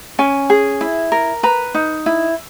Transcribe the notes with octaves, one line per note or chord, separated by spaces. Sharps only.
C#4 G#5
G#4
E4
A#4
B4 A#5
D#4
E4